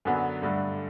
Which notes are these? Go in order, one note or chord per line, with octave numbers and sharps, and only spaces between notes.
F#2 D3 F#3 B3
G2 D3 A3